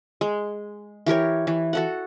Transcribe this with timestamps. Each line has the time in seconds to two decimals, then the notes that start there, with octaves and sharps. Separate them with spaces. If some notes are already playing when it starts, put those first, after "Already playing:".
0.21 G#3
1.06 E3 G4 A#4 C#5
1.47 E3
1.73 F#4 A4 F#5